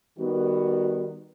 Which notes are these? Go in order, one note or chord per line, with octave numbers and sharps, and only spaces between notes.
D#3 G3 B3 F#4